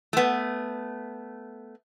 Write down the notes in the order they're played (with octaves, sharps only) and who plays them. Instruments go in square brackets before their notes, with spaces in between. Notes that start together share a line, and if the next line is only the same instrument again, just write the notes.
[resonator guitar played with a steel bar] A3 B3